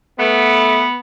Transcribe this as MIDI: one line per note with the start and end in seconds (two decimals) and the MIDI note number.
0.19 0.84 57
0.19 0.99 59